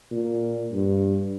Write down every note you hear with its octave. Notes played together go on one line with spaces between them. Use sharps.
A#2
G2